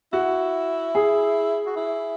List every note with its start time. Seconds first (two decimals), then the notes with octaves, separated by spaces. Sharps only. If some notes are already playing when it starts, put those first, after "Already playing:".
0.13 E4 F#4
0.95 G#4
1.67 F#4
1.77 E4